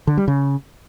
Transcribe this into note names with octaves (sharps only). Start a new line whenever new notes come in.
D3
G3
C#3